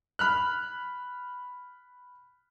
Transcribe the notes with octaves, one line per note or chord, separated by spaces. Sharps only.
B5 F6 F#6